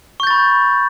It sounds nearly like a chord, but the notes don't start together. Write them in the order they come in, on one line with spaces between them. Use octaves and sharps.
C#6 G6 A6 B5